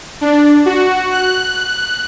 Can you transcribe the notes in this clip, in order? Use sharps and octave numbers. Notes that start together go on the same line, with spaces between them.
D4
F#4
F#6